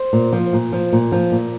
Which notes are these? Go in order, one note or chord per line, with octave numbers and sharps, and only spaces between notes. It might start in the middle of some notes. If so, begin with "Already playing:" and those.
Already playing: C5
A#2
F3
A#2
F3
A#2
F3
A#2